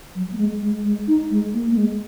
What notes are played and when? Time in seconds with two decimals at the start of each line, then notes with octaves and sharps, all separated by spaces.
0.15 F#3
0.32 A#3
0.37 G#3
0.62 G#3
0.84 G#3
1.08 D#4
1.31 G#3
1.54 A#3
1.72 A#3
1.77 G#3